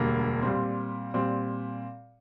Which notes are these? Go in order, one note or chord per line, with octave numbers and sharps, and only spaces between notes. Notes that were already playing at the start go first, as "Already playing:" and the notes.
Already playing: E1 D2 D3 G3 A#3
A#2 G3 C4
A#2 G3 C4